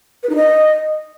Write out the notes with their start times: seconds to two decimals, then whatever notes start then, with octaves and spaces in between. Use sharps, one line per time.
0.23 B4
0.29 D#4
0.36 D#5